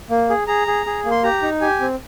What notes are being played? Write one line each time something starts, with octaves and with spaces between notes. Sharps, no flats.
A#3
G#4
G#4 A#5
G#4
G#4
A#3
C6
G4 A#5
D#4
G4 G#5
C4